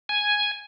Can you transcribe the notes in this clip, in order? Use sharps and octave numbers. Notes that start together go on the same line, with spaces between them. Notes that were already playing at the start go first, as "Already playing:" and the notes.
G#5